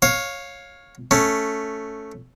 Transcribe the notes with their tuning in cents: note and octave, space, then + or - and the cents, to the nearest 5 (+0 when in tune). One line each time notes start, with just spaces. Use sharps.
C#5 -5 F5 +15
A3 +0 C#4 +0